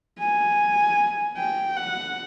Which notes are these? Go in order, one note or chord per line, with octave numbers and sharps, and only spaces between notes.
G#5
G5
F#5